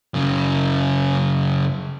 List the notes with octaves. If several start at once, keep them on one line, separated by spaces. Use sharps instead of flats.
F#2 C#3